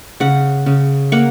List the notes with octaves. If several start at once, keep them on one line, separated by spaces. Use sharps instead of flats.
C#3 F#5
C#3
A#3 F#5